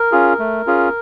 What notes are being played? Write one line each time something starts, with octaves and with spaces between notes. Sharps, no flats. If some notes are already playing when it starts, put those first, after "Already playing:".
Already playing: A#4
C#4 F4 G#4
A3
C#4 F4 G#4